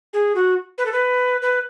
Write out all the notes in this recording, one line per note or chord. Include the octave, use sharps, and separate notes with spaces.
G#4
F#4
B4
A4
B4
B4